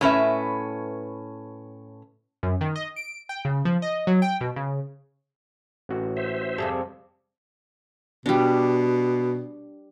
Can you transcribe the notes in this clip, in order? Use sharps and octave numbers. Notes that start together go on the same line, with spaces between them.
A2 C#4 B4 E5
F#2
D#3
D#5
D7
G5
C#3
F3
D#5
F#3
G5
B2
C#3
A1 F#4
C5 E5
F2 C3 G3 G#4 A4
B2 G3 D4